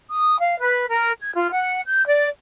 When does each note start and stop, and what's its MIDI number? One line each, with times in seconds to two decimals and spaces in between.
0.11 0.37 87
0.40 0.58 77
0.59 0.86 71
0.89 1.12 70
1.20 1.31 92
1.35 1.51 65
1.53 1.81 78
1.85 2.06 91
2.08 2.28 74